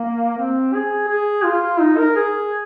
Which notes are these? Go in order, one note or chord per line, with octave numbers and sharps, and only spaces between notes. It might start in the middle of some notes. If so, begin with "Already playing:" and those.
Already playing: A#3
C4
G#4
G#4
F4
D#4
A#4
G#4